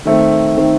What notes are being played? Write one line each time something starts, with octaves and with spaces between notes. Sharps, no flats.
D#3 A3 C4
D#3 A3 C4